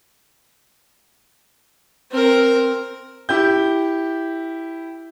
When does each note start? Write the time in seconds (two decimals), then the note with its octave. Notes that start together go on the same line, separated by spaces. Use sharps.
2.11 C4 A#4
3.29 E4 G4 G6